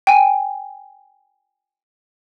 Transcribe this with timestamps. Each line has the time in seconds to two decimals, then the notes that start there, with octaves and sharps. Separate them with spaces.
0.07 G5 G#5